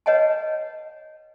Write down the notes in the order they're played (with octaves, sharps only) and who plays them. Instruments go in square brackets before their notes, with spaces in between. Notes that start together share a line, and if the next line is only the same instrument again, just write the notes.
[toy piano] B4 C#5 D#5 F#5 G#5 A5